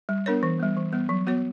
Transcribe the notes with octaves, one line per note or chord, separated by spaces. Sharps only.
G3
B3 D4 A#4 C#5
E3
G3 B3
E3
G3 B3
F#3
B3 F#4 C#5